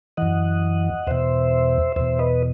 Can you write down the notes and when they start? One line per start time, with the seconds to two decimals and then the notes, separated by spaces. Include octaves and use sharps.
0.17 F#2 E3 D#5 F#5
1.07 E2 B2 C5 E5
1.96 E2 B2 C5 E5
2.19 B4 D#5